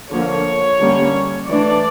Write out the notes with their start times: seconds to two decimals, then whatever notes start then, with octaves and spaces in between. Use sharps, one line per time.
0.11 D3 F3 A#3 C#5
0.80 D3 G3 A#3 C#4
1.48 E3 A3 D4 D5